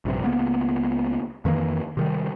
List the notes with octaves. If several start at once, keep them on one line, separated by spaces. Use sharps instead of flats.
A#1 G2 C3
C#2 A#3 B3
F2 D#3 E3 A#3
C3 D#3 G3